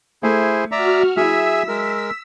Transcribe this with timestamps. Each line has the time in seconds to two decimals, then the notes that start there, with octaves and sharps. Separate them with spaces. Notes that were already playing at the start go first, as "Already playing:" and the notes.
0.23 A3 E4 G#4 C5
0.72 F#4 D5 E5 A#5 F6
1.17 F#3 E4 G#4 E5 E6 B6
1.68 G#3 A#4